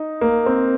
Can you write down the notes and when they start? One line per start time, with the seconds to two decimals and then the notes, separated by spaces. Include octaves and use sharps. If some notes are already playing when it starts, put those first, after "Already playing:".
Already playing: D#4
0.21 A#3
0.46 C4